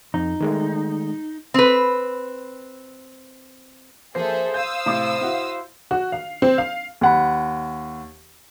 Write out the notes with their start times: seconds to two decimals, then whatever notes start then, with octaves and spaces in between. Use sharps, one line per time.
0.14 F2 D#4
0.41 D#3 G#3 A3
1.54 C4 B4
4.15 F3 A#3 G#4 A4 C5 E5
4.54 F5 D#6 E6 G6
4.86 A2 C3 D6
5.21 E4 F#4
5.91 F#4
6.12 F5
6.42 C4
6.58 F5
7.01 D#2 F#5 B5